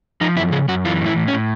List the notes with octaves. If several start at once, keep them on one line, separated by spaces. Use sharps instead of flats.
F3 D#4
F#2 E4
C#3 G#4
F#2 F#4
E3 F4
A2 E4
A2
C#4
A2